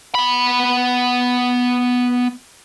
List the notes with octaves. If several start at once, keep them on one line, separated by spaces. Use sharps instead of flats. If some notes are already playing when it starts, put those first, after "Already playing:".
B3 B5